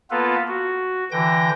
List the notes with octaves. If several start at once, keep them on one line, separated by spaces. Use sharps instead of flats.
A#3 B3 F4 A4 B4
F#4
D3 E3 G5 G6 A#6